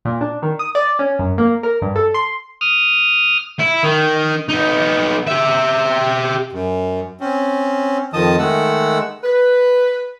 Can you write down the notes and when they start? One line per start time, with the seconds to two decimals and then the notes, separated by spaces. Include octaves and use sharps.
0.05 A#2
0.21 D4
0.42 D#3
0.59 D#6
0.75 D5
0.99 C#4
1.19 F#2
1.38 A#3
1.63 A#4
1.82 G2
1.96 A4
2.14 C6
2.61 D#6 F6
3.59 E4
3.83 D#3
4.49 B3 D#4
5.27 G4 E5
6.50 F#2
7.20 C4 C#4
8.13 F2 D#3 F3 D#5 A5 D#6
8.39 D#3 G#3 A3 F#5 E6
9.24 B4